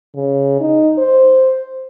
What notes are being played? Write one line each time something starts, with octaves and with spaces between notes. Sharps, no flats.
C#3
D#4
C5